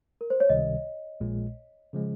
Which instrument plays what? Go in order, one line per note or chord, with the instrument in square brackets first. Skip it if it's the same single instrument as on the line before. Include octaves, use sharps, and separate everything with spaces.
[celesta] A#4
C5
C#5
[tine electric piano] C#2 C3 D#3 G3 [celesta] D#5
[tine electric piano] A#1 A#2 G#3
C#3 F3 G#3